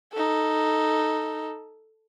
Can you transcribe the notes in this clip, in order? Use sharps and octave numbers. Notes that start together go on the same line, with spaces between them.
D#4 A4